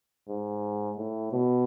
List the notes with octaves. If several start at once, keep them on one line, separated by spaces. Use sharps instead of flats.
G#2
A2
B2